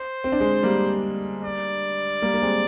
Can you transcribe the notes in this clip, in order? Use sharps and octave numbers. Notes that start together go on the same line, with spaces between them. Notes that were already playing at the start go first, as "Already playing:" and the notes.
Already playing: C5
C4
D4
G#3 C4
G3 A#3
D5
G3 A#3
A#3
G#3 C4